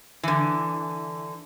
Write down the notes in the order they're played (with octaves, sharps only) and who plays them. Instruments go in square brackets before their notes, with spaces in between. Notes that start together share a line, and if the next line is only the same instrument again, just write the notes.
[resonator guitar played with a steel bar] D3 E3